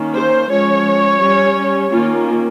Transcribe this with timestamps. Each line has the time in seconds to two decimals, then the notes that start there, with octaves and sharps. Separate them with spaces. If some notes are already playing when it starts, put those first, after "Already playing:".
Already playing: D#3 A#3 C#4
0.15 C5
0.49 F3 G#3 C#4 C#5
1.20 G3 C#4
1.91 D#3 A#3 C#4 F4